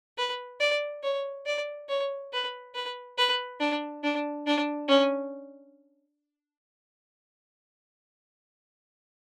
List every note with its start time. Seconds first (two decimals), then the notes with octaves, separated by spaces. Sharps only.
0.18 B4
0.60 D5
1.03 C#5
1.46 D5
1.88 C#5
2.32 B4
2.75 B4
3.18 B4
3.60 D4
4.03 D4
4.46 D4
4.88 C#4